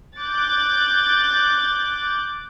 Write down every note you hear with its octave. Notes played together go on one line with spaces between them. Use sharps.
D6 F#6 G6 A6